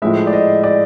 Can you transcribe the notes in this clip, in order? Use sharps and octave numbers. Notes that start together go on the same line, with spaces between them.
A2 F3 G#3 E5
D5
D#5
D5